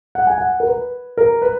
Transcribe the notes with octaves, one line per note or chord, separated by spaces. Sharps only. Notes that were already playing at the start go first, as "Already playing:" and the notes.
F#5
G#5
F#5
A#4
B4
A#4
B4